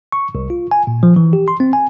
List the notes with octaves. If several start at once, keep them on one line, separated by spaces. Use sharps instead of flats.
C#6
C2
F4
G#5
A#2
F3
E3
G4
C6
C4
G#5